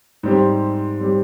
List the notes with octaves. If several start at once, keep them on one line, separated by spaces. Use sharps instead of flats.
G#2 G3 C4 G4
G3 C4 G4